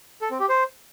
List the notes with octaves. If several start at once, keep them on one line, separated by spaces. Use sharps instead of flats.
A4
C4
G4
C5